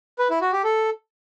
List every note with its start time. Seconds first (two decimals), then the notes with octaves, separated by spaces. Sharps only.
0.19 B4
0.30 E4
0.41 F#4
0.53 G4
0.64 A4